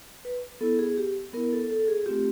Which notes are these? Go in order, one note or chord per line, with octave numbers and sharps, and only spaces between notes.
B4
B3 E4 A4
G#4
G4
B3 E4 A#4
A4
A4
G#4
A3 C4 F4 G4